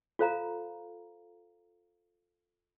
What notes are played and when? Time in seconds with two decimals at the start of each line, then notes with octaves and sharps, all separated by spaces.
0.19 F4 A4 C5 F5 A#5